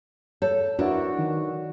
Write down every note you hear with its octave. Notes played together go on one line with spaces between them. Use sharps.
A4 C#5
D4 E4 F#4 A#4 B4
D#3